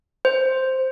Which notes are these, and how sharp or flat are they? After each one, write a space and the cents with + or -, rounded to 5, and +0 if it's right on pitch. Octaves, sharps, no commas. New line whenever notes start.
C5 +0